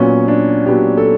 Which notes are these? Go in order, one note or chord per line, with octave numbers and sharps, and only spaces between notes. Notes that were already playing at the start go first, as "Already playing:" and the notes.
Already playing: A#2 F#3 B3 C#4
D4
A#2 F#3 B3 G4
A4